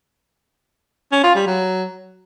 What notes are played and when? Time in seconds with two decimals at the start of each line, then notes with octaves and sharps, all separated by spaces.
1.12 C#4
1.23 F4
1.35 G3
1.47 F#3